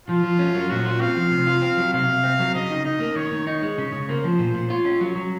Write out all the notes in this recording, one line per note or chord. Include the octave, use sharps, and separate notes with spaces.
F3 F4
F3
C#4
F#3
A#2 F#4
F4
C4 F5
F3
C3
F4
C4
F#3
C3 F5
C3
C4
F#3
C#3 D#5
D#4
D#4 D#5
A#3
D#3 C#5
D#3
D#4 C#5
G#3
C#3
C#3
A#3 C5
F3
A#2
A#2
F4 C#5
C#4
F#3
F#3